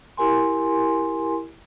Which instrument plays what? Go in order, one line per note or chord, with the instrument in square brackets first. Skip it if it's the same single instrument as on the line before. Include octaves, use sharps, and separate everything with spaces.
[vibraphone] E4 G4 A#4 G#5 C6